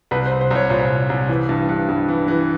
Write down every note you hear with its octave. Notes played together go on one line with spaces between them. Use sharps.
C2 B4
C5
C2
C5
C2 C#5
A#2 C5
C2
C2
E3
G2
G2
G2
E3
E3